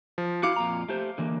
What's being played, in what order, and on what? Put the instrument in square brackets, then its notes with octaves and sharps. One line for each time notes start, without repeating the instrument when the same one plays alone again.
[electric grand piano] F3
[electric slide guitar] E4 F#4 [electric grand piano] F5 D6 C#7
[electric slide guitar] F2 A#2 A#5
A3 G4 C5
D3 E3 A#3